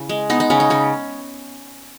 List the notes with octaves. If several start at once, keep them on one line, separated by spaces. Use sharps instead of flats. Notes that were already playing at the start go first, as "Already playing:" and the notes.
Already playing: C#3 E4
G#3
B3 D#4
D#4
C#3 C#4
D#4
C#3 C#4